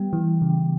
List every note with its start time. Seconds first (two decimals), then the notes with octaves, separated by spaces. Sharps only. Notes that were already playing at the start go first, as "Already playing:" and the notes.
Already playing: G3 B3 G5
0.13 E3
0.42 C#3